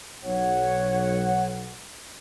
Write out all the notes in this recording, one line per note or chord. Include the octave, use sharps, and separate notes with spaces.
B1 C#5 F#5